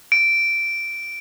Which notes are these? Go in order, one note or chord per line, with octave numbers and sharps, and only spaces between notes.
D7